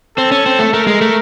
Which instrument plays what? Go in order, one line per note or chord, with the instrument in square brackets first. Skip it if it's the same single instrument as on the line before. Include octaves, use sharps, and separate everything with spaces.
[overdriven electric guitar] C4 [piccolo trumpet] A4
[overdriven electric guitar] C#4
C4
A3
[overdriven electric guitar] A3 [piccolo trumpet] A#4
[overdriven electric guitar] G#3
A3